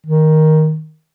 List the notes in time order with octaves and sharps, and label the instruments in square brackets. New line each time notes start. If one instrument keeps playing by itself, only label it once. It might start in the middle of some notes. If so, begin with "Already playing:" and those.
[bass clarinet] D#3